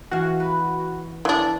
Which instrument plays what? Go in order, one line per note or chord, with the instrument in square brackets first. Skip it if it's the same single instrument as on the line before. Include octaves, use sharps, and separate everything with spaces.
[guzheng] E3 F5 [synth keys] F#4
[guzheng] B4
[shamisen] E3 D4